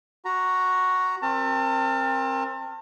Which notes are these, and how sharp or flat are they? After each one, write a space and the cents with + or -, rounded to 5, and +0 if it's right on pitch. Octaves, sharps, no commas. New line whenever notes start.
F#4 +0 A#5 +0
C4 +30 A#4 +0 A5 +35